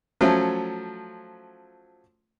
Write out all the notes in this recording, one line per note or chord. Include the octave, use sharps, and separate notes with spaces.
F3 F#3 A3 C#4